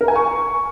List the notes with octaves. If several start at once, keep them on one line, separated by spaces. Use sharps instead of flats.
A#4
G#5
C#6